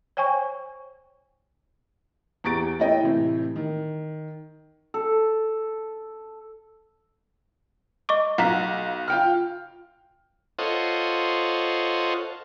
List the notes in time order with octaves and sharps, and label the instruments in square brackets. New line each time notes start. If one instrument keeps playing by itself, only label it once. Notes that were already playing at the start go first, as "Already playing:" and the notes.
[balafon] C5 C#5 G5 G#5 C#6
[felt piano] E2 G4 A#5 C#6 A6 D7
A3 E4 C#5 D#5 G5
A2 C3 E3
D#3
[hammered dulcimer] A4
[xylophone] D#5 C#6 D6
[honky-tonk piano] B1 F5 [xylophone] F#5 A#5 B6
[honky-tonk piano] F4 G5 F6
[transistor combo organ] F4 A4 C5 C#5 D#5 F#5